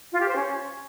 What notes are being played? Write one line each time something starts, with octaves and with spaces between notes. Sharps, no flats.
F4
G4
C5
C#4